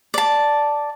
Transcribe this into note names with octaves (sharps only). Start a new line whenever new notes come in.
D5 A5